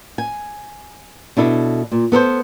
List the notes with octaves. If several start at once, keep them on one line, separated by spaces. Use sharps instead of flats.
G#5
B2 D4 E4 A4
A#2
B3 A4 A#4 C5